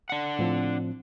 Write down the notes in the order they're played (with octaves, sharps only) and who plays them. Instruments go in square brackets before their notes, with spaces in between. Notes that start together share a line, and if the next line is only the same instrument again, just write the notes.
[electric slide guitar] D4 F#5
[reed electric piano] A2 F3 C4